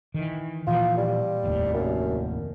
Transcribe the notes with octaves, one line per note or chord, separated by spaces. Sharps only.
D#3 E3
A#2 E3 F3 F4
G3
F1 D#2 A2
F#2